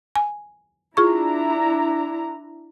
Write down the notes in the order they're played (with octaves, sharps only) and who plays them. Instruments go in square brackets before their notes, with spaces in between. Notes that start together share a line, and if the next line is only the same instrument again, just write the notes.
[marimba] G#5
[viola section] D4 E4 A#5 [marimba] F4 G#4 C#6